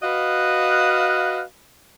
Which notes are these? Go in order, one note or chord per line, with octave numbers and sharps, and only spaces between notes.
F#4 B4 D#5 F5